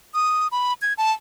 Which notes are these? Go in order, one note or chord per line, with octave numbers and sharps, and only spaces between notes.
D#6
B5
G#6
A5